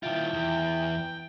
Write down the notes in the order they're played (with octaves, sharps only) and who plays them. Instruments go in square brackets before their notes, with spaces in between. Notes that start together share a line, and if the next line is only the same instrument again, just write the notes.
[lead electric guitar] D#3 F4 [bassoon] E4 [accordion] G5
[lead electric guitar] E2